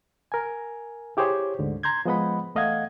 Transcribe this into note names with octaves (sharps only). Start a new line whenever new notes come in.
A#4 G#5
E4 G4 G#4 C5 C#5
D2 G#2 D3
A#5 C6 G6 G#6
F3 G#3 B3 D#5 F#5 B5
E2 A3 D#5 F5 F#5 G#6